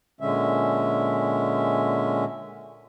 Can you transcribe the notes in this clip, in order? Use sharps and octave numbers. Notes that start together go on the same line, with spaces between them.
A#2 D3 G#3 C#4 E5